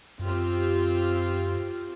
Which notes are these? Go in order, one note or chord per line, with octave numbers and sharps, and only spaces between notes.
F#2 C4 F4 G4